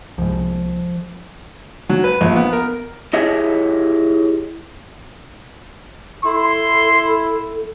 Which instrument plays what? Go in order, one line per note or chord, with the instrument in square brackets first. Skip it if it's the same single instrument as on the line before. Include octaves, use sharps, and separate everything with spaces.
[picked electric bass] C2 G#2 [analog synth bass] F3
[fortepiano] F#3
B4
A#1
B3
A#4
[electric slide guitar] E4 G4 G#4 C#5 D#5 E5
[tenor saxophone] E4 [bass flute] A4 [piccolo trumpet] C6